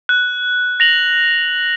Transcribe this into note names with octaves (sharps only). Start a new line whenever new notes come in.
F#6
A#6 F7 F#7